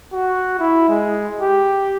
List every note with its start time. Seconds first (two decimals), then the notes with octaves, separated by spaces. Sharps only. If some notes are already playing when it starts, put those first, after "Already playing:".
0.13 F#4
0.59 E4
0.89 G#3
1.41 G4